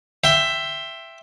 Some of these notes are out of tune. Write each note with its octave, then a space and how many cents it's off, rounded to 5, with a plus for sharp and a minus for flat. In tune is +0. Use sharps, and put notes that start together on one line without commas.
E5 +10 G5 +0 C6 +20